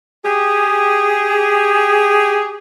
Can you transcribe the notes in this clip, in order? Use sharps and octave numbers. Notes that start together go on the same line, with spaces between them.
G4 G#4